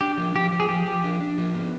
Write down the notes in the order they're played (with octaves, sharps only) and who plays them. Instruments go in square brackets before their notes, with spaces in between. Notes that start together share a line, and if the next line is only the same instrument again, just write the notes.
[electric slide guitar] D4 [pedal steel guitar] G4
[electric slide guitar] F3
[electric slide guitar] F3 [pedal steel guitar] G4
[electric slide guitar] F3
[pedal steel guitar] G#4
[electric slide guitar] F3 [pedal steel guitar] G4
[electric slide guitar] F3
D4
D4
F3
B3